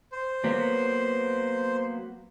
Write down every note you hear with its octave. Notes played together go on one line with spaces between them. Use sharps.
C5
F#3 A#3 B3